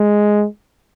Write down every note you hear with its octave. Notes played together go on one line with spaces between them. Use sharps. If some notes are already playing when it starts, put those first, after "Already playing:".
Already playing: G#3